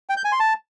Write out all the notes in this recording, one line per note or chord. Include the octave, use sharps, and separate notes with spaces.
G5
G6
G#5
C6
A5